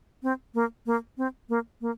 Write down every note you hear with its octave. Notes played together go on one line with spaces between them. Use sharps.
C4
A#3
A#3
C4
A#3
A#3